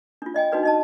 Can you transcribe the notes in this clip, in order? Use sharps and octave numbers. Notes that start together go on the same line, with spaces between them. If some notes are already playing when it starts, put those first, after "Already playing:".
D4 F4
D5 D#5 G5 G#5
D4 D#4 F#4 B4 D5
D#4 D#5 A5